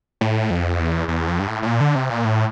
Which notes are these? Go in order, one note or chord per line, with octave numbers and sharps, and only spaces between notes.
A2
F2
E2
E2
F2
G2
A2
A2
A#2
D3
C3
A#2
A2